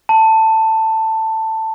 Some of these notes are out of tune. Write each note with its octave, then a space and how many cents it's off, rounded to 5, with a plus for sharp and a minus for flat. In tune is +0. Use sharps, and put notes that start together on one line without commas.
A5 +10